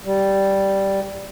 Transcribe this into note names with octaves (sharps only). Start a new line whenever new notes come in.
G3